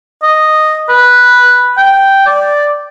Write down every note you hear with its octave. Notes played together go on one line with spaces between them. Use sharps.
D#5
B4
G5
D5